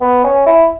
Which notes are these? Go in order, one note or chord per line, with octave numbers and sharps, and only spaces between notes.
B3
C#4
E4